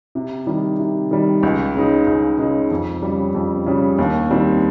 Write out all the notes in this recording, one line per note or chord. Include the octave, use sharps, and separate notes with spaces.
C3
D#3 G3
C3
D#3 G3
C#2
C#3 G#3 D#4
C#2
C#3 G#3 D#4
F2
C#3 G3
F2
C#3 G3
D#2
D#3 G3 C4